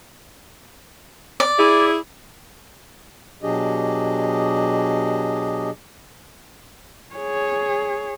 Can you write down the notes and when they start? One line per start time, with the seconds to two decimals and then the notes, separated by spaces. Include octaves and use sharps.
1.40 D5
1.58 E4 G#4
3.43 B2 F#3 D4 G4 G#4 D#5
7.16 G#4 C#5